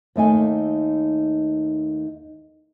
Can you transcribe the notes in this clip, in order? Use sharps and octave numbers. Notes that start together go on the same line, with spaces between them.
D#2 A3 D#4 G#5